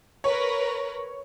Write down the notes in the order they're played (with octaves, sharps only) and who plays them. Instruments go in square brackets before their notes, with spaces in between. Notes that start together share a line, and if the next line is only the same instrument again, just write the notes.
[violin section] A#4 B4 [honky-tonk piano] C#5